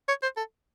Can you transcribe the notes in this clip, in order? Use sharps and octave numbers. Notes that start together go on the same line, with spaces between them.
C#5
C5
A4